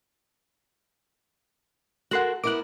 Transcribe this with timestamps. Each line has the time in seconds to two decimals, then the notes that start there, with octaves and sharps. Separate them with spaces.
2.11 F#4 A4 A#4 F#5 C6 F#6
2.44 B3 E4 A#4 D6 F#6